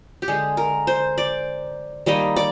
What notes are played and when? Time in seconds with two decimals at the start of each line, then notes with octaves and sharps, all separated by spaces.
0.22 G4
0.28 D3 G#3 G#4
0.57 A#4
0.87 C5
1.18 D5
2.06 D#3 G3 A#3 D#5
2.36 D5